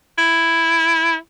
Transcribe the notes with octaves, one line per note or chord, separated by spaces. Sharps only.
E4